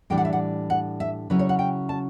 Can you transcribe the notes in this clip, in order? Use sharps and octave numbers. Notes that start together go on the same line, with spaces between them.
A2 E3 G3 D4 G5
F#5
E5
F#5
F#5
E5
C#3 F#3 C#4 E4 B4
C#5
F#5
G5
A5